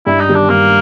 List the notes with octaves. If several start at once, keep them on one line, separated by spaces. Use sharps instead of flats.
G2 E4
D#4
D#3 G3
D4
G2 A#3